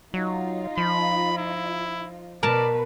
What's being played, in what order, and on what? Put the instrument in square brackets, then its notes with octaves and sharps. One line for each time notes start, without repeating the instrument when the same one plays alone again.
[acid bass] F#3 [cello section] D#4 F4
[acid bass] F3 [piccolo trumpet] B5
[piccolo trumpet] E4
[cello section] B2 B4 [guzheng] A#4 A5 [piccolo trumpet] D5